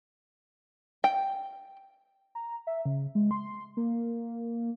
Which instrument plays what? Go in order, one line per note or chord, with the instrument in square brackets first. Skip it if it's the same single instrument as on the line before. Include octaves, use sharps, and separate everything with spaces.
[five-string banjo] G5
[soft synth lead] A#5
E5
C#3
G#3
C6
A#3